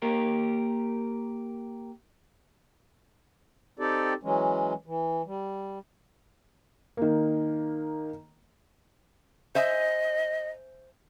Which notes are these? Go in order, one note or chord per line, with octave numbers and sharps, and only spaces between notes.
A#3 G4 A#4
C4 D#4 G4 A4 D5
E3 F#3 G#3 C#4
E3
G3
D#3 A#3
C5 D#5 E5 G#5